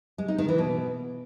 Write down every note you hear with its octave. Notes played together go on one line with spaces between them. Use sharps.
G#3
D#4
D#3
E3
B2